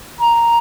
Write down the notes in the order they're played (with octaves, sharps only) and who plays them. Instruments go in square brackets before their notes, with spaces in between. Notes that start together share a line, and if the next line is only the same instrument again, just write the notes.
[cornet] A#5